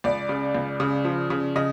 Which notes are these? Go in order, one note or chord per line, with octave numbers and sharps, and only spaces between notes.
C#2 D5
C#3
C#2
C#3
F3
C#3
C#3 D#5